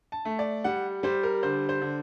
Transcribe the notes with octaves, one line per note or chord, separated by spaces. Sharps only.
A5
A3
D5
G3 F#5
G3 C5
A#4
D3 C5
C5
D3